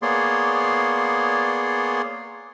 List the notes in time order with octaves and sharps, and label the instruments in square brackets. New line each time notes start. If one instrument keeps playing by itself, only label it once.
[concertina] A#3 B3 G#4 C#5 D5 C6